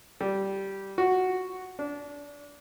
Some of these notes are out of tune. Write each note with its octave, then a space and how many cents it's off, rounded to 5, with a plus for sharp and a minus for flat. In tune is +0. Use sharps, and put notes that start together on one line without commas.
G3 -10
F#4 +0
D4 -25